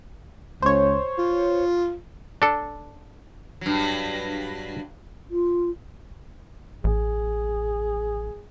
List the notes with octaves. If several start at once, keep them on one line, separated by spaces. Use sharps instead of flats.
C#2 C5 C#5
F4
D4 A4
G2 F#3
F4
A1 G#4